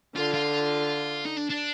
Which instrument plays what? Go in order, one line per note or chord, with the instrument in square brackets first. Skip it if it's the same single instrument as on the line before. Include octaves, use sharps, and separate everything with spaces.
[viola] D3 [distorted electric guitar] F4
[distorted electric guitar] F4
D#4
D4
D4